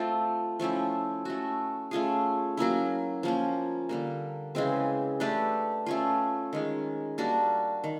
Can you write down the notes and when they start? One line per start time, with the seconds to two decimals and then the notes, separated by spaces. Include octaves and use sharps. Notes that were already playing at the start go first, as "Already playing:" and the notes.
Already playing: A3 C4 F4
0.60 F3 A3 C#4 E4
1.25 A3 C#4 F#4
1.91 A3 C#4 F4 G#4
2.57 F#3 A#3 C#4 E4
3.23 F3 A#3 C#4
3.89 D3 G3 A#3
4.55 C#3 E3 G#3 C4
5.20 A3 D4 G4 B4
5.86 A3 C#4 F4
6.53 D#3 G#3 C#4
7.18 G3 A#3 D4 F#4
7.84 D#3